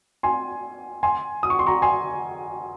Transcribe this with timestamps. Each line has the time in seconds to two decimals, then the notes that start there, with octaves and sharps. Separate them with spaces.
0.23 G#5 C6
1.03 G#5 C6
1.43 D#6
1.50 C#6
1.59 C6
1.67 A#5 C#6
1.82 G#5 C6